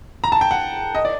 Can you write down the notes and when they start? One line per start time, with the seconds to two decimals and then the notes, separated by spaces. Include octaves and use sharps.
0.24 A#5
0.32 A5
0.41 G5
0.51 F#5
0.95 D#5
1.05 D5